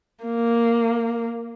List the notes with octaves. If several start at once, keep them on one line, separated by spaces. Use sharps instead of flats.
A#3